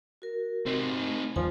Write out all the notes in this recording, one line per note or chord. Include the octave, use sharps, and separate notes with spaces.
F#4 A#4
C3 C4 D#4
A3
D#2 F3 G3 G#5